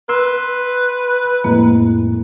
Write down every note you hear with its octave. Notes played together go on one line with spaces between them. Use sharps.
B4 C6 E6
F2 A2 G#3 A#3